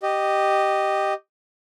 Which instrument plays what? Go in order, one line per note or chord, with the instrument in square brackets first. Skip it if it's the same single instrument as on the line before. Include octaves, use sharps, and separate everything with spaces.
[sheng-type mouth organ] G4 D#5